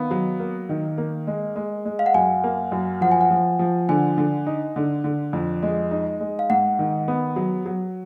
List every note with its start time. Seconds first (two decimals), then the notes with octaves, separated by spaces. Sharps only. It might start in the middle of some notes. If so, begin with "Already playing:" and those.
Already playing: D#3 B3 F5
0.11 F#3
0.40 A#3
0.69 D#3
0.98 A#3
1.27 G#3
1.56 G#3
1.85 G#3
1.99 F5
2.06 F#5
2.14 F#2 G#5
2.44 A#3
2.72 F#2
3.01 F3 F#5
3.12 G#5
3.21 F#5
3.30 F3
3.59 F3
3.89 D3 G#5
4.18 D3
4.46 D#4
4.76 D3
5.04 D3
5.33 F2
5.62 G#3
5.91 D#4
6.20 G#3
6.39 F5
6.50 G#2 F#5
6.79 D#3
7.08 B3
7.36 F#3
7.65 F#3